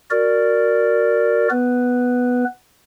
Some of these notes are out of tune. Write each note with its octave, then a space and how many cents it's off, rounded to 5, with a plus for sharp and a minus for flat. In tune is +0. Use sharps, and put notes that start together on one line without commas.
F#4 +0 A#4 -10 D5 +0
B3 +0 B4 +0